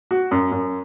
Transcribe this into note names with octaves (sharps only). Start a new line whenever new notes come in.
F#4
F#2
F#2